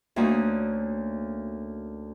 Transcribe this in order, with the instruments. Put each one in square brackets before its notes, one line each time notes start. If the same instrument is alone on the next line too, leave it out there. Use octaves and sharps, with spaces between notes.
[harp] D2 A#3 C#4 F#4 D#6